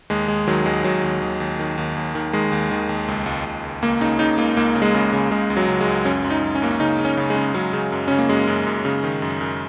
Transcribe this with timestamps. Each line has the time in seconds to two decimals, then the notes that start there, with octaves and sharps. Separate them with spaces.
0.10 D#2 G#3
0.28 D#2 G#3
0.47 D#3 F#3
0.66 D#2 G#3
0.84 D#2 F#3
1.03 D#2
1.22 D#2
1.40 D#2
1.59 D#3
1.78 D#2
1.96 D#2
2.15 D#3
2.33 D#3 G#3
2.52 D#2
2.71 D#3
2.89 D#2
3.08 C#2
3.26 C#2
3.45 C#2
3.64 C#2
3.82 C#2 A#3
4.01 C#3 D#4
4.19 C#3 D#4
4.38 C#2 A#3
4.57 C#2 A#3
4.75 C#3
4.82 G#3
4.94 C#3
5.13 C#3
5.31 C#3 G#3
5.50 C#2
5.57 F#3
5.69 C#3
5.81 G#3
5.88 C#2
6.05 F#2 C#4
6.24 F#2
6.30 D#4
6.43 F#2
6.55 C#4
6.62 F#2 A#3
6.71 C#4
6.80 C#3 D#4
6.99 C#3
7.05 C#4
7.17 C#3
7.30 G#3
7.36 C#3
7.54 C#3 F#3
7.73 C#3
7.92 F#2
8.08 C#3 C#4
8.18 A#3
8.29 F#2 G#3
8.47 F#2
8.67 F#2
8.85 C#3
9.04 D#3
9.22 F#2
9.41 F#2